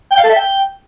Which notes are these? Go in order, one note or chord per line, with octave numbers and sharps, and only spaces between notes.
G5
F5
A4
E5
G5